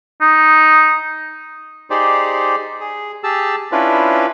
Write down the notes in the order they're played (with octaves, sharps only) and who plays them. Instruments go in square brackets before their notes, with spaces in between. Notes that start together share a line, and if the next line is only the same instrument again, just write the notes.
[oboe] D#4
[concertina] D#4 G4 G#4 C5 D5
G#4
G4 G#4 A5 E6
C#4 D4 E4 F4 B4